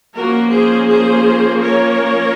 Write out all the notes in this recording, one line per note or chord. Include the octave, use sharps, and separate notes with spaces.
F3 A#3 C#4 F#4 A#4
G#4 C5
G#4 C5
A#4 C#5